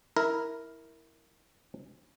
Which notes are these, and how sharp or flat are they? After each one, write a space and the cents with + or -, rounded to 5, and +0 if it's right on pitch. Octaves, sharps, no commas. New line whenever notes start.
E4 -10 A#4 +0